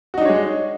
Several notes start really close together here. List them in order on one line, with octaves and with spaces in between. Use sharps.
F#4 D#4 D4 C#5 G#3